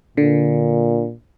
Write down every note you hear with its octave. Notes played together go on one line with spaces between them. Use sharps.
A#2 D3